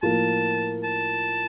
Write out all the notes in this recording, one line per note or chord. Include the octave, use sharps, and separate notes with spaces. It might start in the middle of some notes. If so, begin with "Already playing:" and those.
A2 F3 A#3 F4 A#4 A5
A5